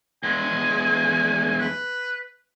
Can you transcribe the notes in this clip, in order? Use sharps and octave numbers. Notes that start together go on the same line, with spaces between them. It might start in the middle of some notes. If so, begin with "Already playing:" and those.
E2 G#3 G#5
B4